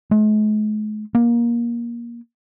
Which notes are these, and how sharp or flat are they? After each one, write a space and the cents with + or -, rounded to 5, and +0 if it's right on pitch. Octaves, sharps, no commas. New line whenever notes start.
G#3 +45
A#3 +20